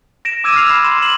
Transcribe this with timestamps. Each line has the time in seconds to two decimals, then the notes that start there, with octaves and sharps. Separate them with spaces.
0.25 A#6 D7 E7
0.44 D6 E6 G#6 D#7 E7
0.56 F6 C7 F7
0.70 B5
0.84 C6 E7
1.02 C7 E7 F#7